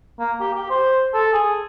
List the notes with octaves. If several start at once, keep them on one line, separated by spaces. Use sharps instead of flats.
A#3
G4
G4
C5
A4
G#4